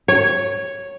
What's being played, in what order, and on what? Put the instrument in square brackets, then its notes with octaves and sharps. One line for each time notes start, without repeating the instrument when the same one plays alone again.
[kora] C#5